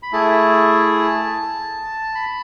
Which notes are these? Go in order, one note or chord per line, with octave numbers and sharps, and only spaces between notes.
B5
A3 E4 G#4 A5
B5